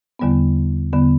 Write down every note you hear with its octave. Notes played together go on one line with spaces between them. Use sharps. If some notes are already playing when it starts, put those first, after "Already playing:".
E2 D3 G3 B3
E2 D3 G3 B3